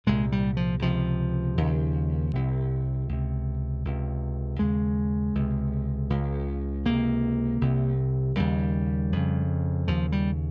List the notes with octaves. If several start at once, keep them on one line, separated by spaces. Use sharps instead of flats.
C2 A#2 G#3
G3
F3
C#2 C3 F3
D#2 C#3
C2 C3
C#2 C3
C#2 C3
D#2 C#3 G#3
C#2 C3
C#2 C#3
C#2 C3 A#3
C2 C3
D#2 C#3 G3
F2 C#3
D#2 C#3 F3
G3